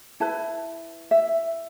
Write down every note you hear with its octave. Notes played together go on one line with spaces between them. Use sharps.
E4 B4 A5
E5